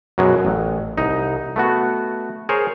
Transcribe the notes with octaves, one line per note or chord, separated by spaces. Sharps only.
F#2 B2 F#3 G#3
A1
C2 D#4
A3 B3 F#4
G#4 A#4 C5 C#5